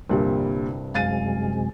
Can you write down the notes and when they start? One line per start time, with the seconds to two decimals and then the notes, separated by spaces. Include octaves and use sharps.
0.09 C2 G2 A#2 D3 G3
0.94 F#2 C3 G#3 F5 A6 D#7